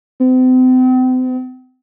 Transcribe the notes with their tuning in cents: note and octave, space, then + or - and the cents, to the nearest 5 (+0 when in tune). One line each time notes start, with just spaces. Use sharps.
C4 -40